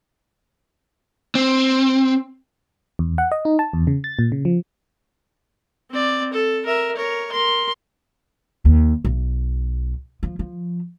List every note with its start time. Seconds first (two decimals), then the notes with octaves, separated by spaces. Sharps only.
1.35 C4
2.99 E2
3.18 F#5
3.32 D#5
3.45 D#4
3.59 A5
3.73 E2
3.87 C#3
4.04 A6
4.19 A#2
4.32 C#3
4.45 F3
5.91 C4 D5
6.33 A4
6.65 A#4 E5
6.96 A#4 C#5
7.31 A#4 C6
8.65 D#2
9.05 B1
10.23 F3
10.39 F3